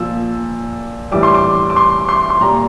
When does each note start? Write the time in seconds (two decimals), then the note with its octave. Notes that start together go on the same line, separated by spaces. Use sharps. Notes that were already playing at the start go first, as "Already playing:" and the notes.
Already playing: A#2 F3 E6
1.11 A2 E3 G3 D6
1.23 C6
1.35 D6
1.70 D6
1.76 C6
2.09 C6
2.30 C6
2.41 A#2 G3 A#5